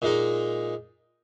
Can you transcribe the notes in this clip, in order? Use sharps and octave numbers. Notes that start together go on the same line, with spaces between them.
A#2 G#3 D#4